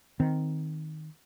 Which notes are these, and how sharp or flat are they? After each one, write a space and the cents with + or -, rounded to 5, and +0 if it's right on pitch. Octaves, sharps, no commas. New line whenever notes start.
D#3 +0 C4 -10